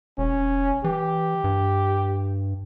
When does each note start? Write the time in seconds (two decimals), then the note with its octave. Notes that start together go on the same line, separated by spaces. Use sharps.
0.18 E1 C#4
0.84 E3 G4
1.44 G2